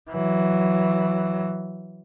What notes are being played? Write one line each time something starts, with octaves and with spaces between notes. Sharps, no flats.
E3 F#3